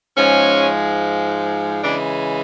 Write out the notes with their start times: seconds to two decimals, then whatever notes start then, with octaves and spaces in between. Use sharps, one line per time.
0.15 G#2 F3 G#3 C#4
1.84 C#3 E3 G#3 D4